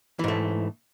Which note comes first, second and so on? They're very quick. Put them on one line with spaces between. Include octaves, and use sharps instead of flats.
E3 G#2 A3